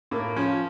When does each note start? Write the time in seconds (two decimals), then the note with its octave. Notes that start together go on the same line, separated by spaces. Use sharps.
0.11 A2 A#3
0.36 F3 C#4